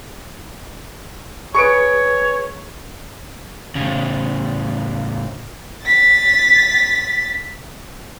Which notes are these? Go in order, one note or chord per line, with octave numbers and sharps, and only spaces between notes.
G#4 B4 C#5 C#6 C#7 D7
A2 C#3
A6 B6